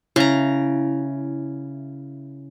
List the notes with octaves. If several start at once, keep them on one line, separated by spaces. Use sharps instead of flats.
C#3 E4 A#5